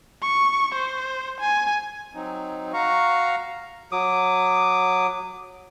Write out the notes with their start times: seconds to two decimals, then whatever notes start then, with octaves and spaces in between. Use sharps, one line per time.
0.22 C#6
0.74 C5
1.40 G#5
2.14 F#3 C4 D#4
2.73 F#4 F5 A#5 C#6
3.92 F#3 D6 D#6